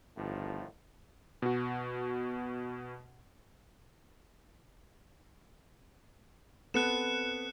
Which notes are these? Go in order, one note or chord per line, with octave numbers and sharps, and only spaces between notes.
G1 A2 D#3 F3
B2 F#4
B3 C4 A4 F#6 C#7 E7